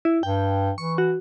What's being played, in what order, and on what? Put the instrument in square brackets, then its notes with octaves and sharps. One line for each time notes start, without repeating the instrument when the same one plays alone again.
[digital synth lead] E4
[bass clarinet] G2 [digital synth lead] G5
[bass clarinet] E3 [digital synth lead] C#6
[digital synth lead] F#4